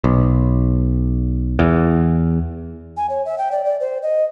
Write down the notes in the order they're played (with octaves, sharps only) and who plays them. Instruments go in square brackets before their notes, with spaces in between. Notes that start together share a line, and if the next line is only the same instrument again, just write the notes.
[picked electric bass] B1
E2
[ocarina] G#5
C#5
E5
G5
D5
D5
C5
D#5